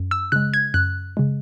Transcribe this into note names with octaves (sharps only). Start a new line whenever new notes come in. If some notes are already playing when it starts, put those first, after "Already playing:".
Already playing: F#2
E6
C#3 G#3 F#6
G#6
F#2 F#6
C#3 G#3